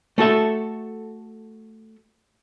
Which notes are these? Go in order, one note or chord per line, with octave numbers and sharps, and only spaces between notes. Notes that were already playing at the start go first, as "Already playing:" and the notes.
A3 F#4 A4 E5